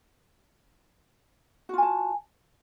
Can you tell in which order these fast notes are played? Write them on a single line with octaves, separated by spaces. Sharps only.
F#4 F4 G#5 A5